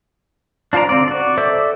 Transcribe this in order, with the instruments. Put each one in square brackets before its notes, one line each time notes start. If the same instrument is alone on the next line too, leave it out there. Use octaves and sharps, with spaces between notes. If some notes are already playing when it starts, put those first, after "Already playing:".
[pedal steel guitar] D4 F4 C5 D5 A#5
D3 C4 C#4 D5
F#4 D5
A4 C5 D5 E5 D6